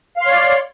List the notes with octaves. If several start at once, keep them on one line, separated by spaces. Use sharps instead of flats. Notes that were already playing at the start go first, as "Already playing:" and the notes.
C#5 D5 F5 C6